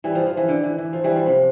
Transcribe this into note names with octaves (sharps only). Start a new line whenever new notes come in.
E3 G3
F3
F3
E3
D3
E3
E3
F3
E3 G3
F3
C3